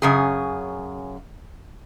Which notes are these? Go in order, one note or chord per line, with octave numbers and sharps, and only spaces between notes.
F#2 C#3 G#4